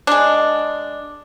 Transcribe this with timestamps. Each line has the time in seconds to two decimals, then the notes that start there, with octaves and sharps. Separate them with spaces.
0.07 G#3 D4